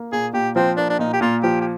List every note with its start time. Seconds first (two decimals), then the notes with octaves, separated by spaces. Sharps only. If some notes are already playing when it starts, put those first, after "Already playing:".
Already playing: A#3
0.12 A#2 G#4
0.33 A#2 G4
0.56 F3 C4
0.77 A#3 D4
0.90 D4
0.99 A#2 D#4
1.13 G4
1.21 A#2 F4
1.43 F3 G4
1.61 G4